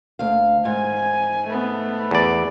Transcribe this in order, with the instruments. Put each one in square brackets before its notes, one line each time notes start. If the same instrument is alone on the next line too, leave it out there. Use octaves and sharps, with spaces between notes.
[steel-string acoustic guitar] D2 F5
[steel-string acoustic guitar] G#2 [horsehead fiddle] G#5
[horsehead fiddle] A3 B3
[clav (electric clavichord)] E2 D5